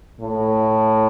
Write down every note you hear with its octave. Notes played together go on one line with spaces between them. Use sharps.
A2